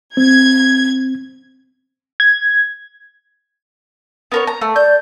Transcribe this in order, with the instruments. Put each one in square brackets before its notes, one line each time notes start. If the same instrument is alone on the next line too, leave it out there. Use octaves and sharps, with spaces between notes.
[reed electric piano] C4 [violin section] G#6
[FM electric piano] G#6
[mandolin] B3 A#4 C#5
A#5
A3
[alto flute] D5 [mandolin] G6